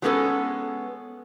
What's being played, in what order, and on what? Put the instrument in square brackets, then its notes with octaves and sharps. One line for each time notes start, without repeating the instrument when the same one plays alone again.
[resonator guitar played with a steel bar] F#3 G#3 B3 C#4 A4 B4